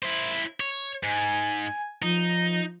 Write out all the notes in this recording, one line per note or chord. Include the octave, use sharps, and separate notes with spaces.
E4 C5
C#5
G#2 G#5
F3 D#4